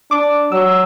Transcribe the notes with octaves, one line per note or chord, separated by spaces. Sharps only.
D4 D6
F#3 E6